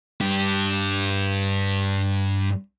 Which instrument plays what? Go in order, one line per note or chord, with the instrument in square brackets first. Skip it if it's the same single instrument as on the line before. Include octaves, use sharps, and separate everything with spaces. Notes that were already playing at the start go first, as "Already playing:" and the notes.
[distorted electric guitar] G2 G4